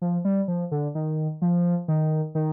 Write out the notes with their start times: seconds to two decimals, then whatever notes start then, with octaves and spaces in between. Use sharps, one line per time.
0.02 F3
0.25 G3
0.48 F3
0.71 D3
0.95 D#3
1.42 F3
1.88 D#3
2.35 D#3